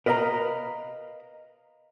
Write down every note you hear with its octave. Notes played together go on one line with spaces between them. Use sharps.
A#4 B4 D#5 F5 A#5 B5